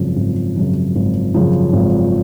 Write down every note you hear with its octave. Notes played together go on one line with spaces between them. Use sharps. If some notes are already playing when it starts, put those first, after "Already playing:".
Already playing: G#1 F#2 C#3 F3
G#1
F#2 C#3 F3
G#1
F#2 C#3 F3
G#1